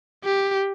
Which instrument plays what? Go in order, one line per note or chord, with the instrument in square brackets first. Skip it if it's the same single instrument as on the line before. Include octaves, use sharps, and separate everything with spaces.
[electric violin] G4